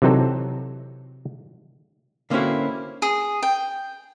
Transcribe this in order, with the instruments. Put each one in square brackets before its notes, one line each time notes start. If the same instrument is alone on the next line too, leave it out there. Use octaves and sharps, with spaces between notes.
[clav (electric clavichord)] C3 E3 F#3 C4 D#4 A4
[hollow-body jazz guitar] D3 A#3 C4 C#4 E4 F#4
[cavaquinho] G#4
G5